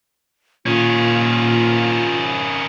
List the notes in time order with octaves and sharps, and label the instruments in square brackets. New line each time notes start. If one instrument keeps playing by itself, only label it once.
[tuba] A#2 [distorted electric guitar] D#3 C#4 [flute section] F4